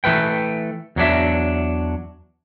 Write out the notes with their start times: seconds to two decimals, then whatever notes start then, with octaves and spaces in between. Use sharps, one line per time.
0.04 E3 A3 B4 G5
0.96 E2 F#3 D4 E5